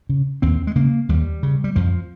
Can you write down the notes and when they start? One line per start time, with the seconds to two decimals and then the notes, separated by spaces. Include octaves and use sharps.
0.09 C#3
0.42 D#2 C4
0.67 G#3
0.76 C#3 A#3
1.09 D#2 G3
1.43 C#3
1.64 G3
1.76 F2 F3